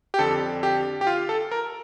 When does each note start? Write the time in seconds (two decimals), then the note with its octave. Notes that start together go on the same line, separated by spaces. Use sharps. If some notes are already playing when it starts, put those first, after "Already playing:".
0.14 G4
0.19 F2 D3 A4
0.63 G4
1.01 G4
1.07 F4
1.29 A4
1.52 A#4